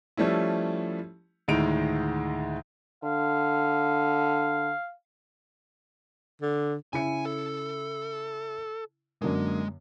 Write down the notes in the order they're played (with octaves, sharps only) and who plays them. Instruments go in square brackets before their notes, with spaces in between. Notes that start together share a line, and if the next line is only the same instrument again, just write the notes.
[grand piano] F3 G3 A3 C#4 E4
D2 A2 D#3 G#3 D7 F7
[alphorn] D3 [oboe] F5
[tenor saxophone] D3
[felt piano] C#3 E4 C#7 [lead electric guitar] G#5
[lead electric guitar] A4
[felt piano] F#2 D3 A#3 [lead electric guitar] G#3